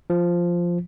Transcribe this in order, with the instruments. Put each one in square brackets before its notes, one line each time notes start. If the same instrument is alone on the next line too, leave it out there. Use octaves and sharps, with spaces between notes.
[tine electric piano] F3